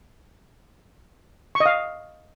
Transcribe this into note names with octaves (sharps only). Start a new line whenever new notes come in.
C#6
D#5
F5